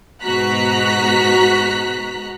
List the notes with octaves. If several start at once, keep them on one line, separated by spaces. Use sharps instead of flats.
G#2 B2 F#4 A#5 F#6 B6